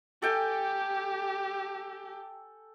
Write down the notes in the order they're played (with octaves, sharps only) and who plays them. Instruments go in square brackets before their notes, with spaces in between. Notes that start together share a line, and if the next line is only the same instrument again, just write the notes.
[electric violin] G4 [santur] A4 G5 G#5